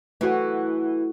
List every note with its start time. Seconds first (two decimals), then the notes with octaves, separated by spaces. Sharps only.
0.21 E3 A3 F#4